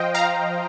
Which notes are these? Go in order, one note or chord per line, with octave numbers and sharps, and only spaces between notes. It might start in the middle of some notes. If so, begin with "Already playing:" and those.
Already playing: F3 C5 D#5 F5 G5
F5 A#5